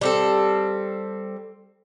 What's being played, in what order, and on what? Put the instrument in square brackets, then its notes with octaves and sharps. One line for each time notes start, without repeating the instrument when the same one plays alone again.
[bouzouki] G3 C4 A4